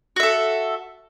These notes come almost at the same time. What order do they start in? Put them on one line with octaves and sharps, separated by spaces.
F#4 E5 A4